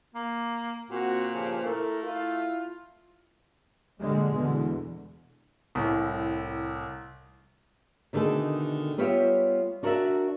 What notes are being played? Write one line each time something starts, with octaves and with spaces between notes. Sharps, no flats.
A#3
A#2 C4 F#4
G2 C#3 F3
A3 E4 A4 A#4
E4 F4
A#2 D3 G3 G#3
E2 B2 D3
C2 A2
B2 D3 D#3 A3 G#4 A4
G3 B3 F4 G4 C#5 E5
D4 F#4 A#4 C#5 D5 E5